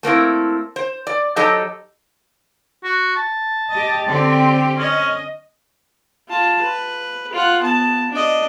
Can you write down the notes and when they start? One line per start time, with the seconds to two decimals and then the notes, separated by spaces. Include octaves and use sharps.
0.03 A3 A#3 C4 E4
0.76 C5
1.07 D5
1.36 F#3 D#4 G4 A4 C5 D#5
2.84 F#4
3.16 A5
3.70 G4 D#5
4.08 D3 C4 G4
4.78 C#4 D#5
6.29 F4 A5
6.62 B4
7.33 F4 F#5
7.62 B3 A5
8.11 D4 D#5